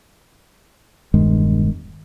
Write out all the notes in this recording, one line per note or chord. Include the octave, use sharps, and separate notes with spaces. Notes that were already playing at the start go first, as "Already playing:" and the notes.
E1 G2 D#3 G#3